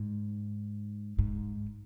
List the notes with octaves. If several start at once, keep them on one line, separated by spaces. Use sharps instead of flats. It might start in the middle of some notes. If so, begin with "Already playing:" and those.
Already playing: G#2
G#2